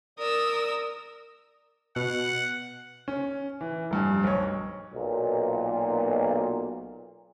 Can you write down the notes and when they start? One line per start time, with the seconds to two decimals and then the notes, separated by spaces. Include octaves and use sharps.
0.19 A#4 D5 D#6 E6
1.96 B2 F#5
3.08 C#4
3.61 E3
3.91 F1 G2 G#5
4.24 B1 C#5
4.94 B1 A#2